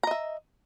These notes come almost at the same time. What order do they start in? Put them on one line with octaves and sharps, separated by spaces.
A#5 D#5 E5